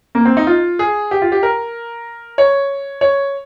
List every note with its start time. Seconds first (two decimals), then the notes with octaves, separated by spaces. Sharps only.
0.15 A#3
0.25 C4
0.37 D#4
0.47 F4
0.79 G#4
1.11 G4
1.22 F4
1.32 G4
1.43 A#4
2.38 C#5
3.01 C#5